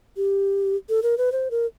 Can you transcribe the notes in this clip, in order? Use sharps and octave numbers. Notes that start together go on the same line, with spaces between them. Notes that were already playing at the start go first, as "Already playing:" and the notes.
G4
A4
A#4
B4
C5
A#4